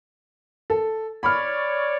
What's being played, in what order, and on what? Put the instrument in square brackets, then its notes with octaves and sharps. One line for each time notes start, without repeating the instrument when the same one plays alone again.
[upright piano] A4
[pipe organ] C#5 D5 [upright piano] B5 F6